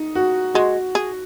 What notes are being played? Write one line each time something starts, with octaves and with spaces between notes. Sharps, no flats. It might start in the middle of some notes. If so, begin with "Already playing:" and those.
Already playing: D#4
F#4
G#3 F#4
G#4